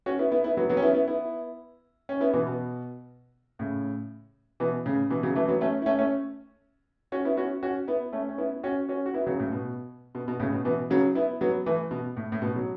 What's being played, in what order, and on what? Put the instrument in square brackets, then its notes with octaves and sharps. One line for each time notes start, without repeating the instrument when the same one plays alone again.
[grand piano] C#4 F#4
B3 E4
B3 E4
B3 E4
F#3 B3
F#3 B3
C#4
B3 E4
B3 E4
B3 E4
C#4
B3 E4
B2 E3
B2
A2 C#3
B2 E3
A2 C#3
B2 E3
C#3 F#3
E3 A3
F#3 B3
A3 C#4
E4
A3 C#4
A3 C#4
C#4 F#4
B3 E4
C#4 F#4
C#4 F#4
B3 E4
A3 C#4
C#4
B3 E4
C#4 F#4
C#4 F#4
F#4
B3 E4
C#3 F#3
A2 C#3
B2
B2
B2
A2 C#3
B2
B2 E3
C#3 F#3
B3 E4
F#3 B3
E3 A3
B2
A2
A2
B2
F#3